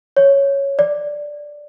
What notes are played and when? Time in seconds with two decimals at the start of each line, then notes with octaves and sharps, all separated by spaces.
0.17 C#5
0.79 D5